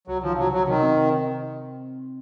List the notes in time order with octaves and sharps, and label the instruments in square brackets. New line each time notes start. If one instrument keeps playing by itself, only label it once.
[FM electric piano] C2 [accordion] F#3
[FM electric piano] D#3 [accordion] F3
[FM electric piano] C3 [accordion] F#3
[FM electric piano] C3 [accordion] F#3
[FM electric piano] C3 [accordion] D#3
[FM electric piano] C4
C3